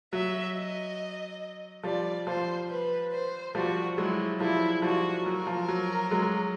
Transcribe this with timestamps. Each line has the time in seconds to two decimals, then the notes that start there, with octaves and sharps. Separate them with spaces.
0.13 F#3 E5
0.55 D#5
1.84 F3 G3 D5
2.26 F3 C5
2.70 B4
3.12 C5
3.55 F3 G3 F#4
3.97 F#3 G#3 E4
4.40 F3 G3 E4
4.82 F3 G3 F#4
5.25 F#3 A#4
5.47 F3
5.69 F#3
6.11 F#3 G#3